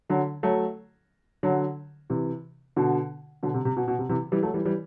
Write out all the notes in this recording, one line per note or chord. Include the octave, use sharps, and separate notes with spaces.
D3 F#3
F#3 A3
D3 F#3
C3 E3
B2 D3
B2 D3
C3
C3
B2
B2
C3
C3 E3
E3 G3
F#3 A3
E3 G3
E3 G3